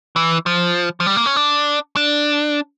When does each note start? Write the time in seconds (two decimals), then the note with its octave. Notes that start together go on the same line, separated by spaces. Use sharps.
0.16 E3
0.46 F3
1.00 F3
1.07 G3
1.16 A#3
1.26 C#4
1.36 D4
1.96 D4